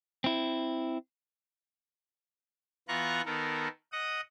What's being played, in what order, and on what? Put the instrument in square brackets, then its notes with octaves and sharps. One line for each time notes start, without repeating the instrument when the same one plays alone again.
[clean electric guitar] C4 E4
[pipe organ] E3 B3 F4 A#5 C#6 F#6
D#3 B3 A4 A#4
D#5 F#5 D#6